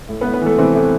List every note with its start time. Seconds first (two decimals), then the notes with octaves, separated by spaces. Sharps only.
0.09 A2
0.21 B3 B4
0.25 A2
0.34 B3 B4
0.41 E3 A3 A4
0.58 C3 E3 C4
0.75 A2